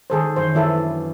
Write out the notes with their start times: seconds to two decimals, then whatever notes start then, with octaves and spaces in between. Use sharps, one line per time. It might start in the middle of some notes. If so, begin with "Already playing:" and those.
0.10 D#3 G#3 G#4 A4 C5
0.36 F#2 E3 C5
0.55 E3 B3 D4 E4 A4